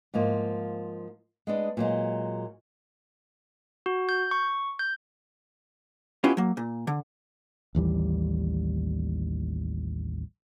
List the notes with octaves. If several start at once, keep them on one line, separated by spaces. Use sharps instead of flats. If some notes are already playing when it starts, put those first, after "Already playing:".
G#2 F3 A#3
G#3 B3 D4
A#2 F#3 G#3
F#4
G6
C#6
G6
B3 C#4 E4 F4 G4
F#3 A#3
A#2
D3
A1 D#2 E3 G3